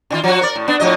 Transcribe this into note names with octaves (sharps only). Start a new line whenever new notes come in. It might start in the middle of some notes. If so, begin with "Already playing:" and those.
D3 D#3 F4
F3 F#4
A#4 D5
A2
B3 D4
A2 F3 D#5